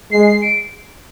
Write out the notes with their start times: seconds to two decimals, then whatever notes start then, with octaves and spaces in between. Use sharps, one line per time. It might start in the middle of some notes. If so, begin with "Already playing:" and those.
0.12 G#3 C7
0.27 C7
0.42 D7